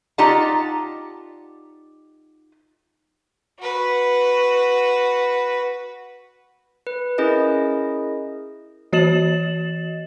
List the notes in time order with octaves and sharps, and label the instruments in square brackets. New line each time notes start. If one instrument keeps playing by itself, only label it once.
[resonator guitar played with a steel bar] D#4 F4 G4 D5 F#5 A5
[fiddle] F#4 B4
[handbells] B4
C#4 E4 G#4 A#4 D#5
[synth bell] E3 F#4 D#5 A6 E7 F#7